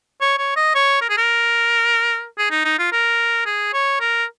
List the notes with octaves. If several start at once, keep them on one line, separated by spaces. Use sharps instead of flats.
C#5
C#5
D#5
C#5
A#4
G#4
A#4
G#4
D#4
D#4
F4
A#4
G#4
C#5
A#4